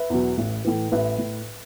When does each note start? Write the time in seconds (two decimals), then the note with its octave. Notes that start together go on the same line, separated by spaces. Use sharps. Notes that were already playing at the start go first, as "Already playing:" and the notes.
Already playing: B4 E5
0.10 E2 B2 F#3
0.38 A1
0.65 A2 E3
0.92 A1 B4 E5
1.18 A2